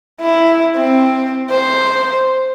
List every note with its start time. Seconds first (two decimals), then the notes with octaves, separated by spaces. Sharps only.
0.21 E4
0.77 C4
1.50 C5